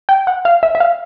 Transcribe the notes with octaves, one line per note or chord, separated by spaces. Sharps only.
G5
F#5
F5
E5
E5
F5